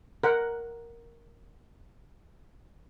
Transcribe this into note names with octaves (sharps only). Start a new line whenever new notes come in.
A#4 F#5